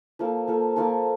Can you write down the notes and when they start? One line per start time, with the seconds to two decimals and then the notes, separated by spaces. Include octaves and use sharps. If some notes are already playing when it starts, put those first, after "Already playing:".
0.19 F3 A#3 F4 A4
0.48 F3 A#3 F4 A4
0.76 F3 A#3 F4 A4